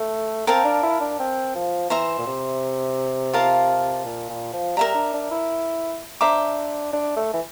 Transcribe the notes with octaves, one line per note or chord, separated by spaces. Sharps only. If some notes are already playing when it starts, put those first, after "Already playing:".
Already playing: A3
C4 A#4 F5 A5
D4
E4
D4
C4
F3
E3 C5 E5 A#5
A#2
C3
F4 A#4 F5 A5
A#2
A#2
F3
G3 A#4 E5 A#5
D4
D4
E4
D4 C5 E5 A#5 D6
D4
A3
E3